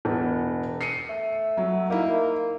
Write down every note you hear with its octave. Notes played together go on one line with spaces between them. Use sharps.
E1 B3
C7 C#7 D#7
A3
F#3
A#3 D#4 E4